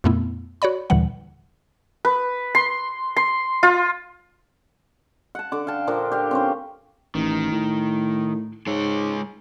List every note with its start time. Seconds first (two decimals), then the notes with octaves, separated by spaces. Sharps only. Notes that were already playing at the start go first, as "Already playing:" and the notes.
0.04 F2 A#2 A3 B3 E4
0.62 F#4 C#5 D5 B5
0.90 D#2 A#2 D3 E3 G3 F#5
2.05 B4
2.55 C6
3.17 C6
3.63 F4
5.35 F#5 A5
5.52 D3 D6
5.67 F5 G5 A5
5.87 A#2 F3 A#3 D4
6.12 G4 F5
6.31 C4 C#4 C5
7.15 A1 D#3
7.51 A2
8.67 G#2 G#3 C#5